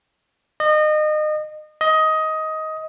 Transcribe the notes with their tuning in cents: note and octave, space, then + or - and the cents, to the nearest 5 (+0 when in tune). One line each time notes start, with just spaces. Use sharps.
D#5 -30
D#5 +15